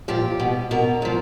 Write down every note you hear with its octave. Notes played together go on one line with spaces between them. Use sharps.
A#2 F3 G4
B2
B2 A#4
A#2 F3